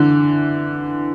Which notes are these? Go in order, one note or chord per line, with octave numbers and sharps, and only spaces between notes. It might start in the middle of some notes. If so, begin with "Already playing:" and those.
Already playing: D3 E3